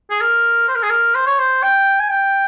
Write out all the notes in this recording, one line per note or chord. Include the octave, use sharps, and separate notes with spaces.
G#4
A#4
C5
A#4
G#4
A#4
C5
C#5
C5
G5
G#5
G5